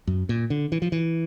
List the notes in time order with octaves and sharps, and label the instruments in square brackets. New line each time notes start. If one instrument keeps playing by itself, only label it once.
[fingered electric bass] F#2
A#2
D3
E3
F3
E3